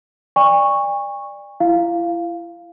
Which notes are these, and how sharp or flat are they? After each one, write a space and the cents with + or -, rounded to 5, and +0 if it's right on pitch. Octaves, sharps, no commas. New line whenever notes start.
D5 +15 G#5 -45 C#6 -5
E4 +35 F5 -5